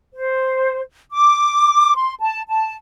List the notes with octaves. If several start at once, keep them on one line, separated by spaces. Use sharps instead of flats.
C5
D6
C6
A5
A5